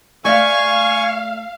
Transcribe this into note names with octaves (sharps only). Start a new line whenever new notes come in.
A3 D5 E5 F5 G#5 C#6